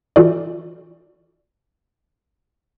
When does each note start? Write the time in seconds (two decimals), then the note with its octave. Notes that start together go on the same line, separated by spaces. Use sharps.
0.16 E3 F4 F#4 A4 D5